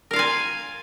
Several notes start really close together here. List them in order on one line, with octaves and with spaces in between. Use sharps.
A#4 F5 F4 G#5